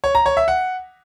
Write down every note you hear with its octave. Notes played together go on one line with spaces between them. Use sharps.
C#5
A#5
C#5
E5
F#5